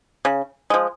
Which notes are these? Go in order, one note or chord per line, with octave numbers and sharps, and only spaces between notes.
C#3
F3 G#3